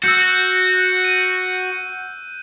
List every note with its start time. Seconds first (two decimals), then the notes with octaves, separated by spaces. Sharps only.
0.04 F#4 E6 F#6 G6
1.05 D#7